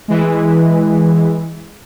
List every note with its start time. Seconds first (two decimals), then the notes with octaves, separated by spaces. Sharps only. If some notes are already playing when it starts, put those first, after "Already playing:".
0.08 E3 G#3